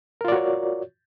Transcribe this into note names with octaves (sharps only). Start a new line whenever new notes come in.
F4 F#4 A#4 C#5 D5